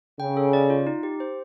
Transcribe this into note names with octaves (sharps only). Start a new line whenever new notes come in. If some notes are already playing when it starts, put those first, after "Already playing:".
C#3 G5
A4
D5
F4
D#4
G4
C5